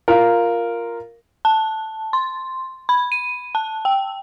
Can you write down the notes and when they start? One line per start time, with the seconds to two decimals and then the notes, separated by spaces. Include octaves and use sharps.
0.08 F4 A#4
1.45 A5
2.13 C6
2.89 B5
3.12 D#7
3.55 A5
3.85 G5